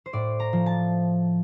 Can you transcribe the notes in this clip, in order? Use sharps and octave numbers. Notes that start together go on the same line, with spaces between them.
C5
A2 D5
A#5
F3
A5